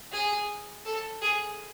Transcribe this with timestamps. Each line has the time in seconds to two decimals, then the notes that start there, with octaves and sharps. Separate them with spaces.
0.12 G#4
0.85 A4
1.22 G#4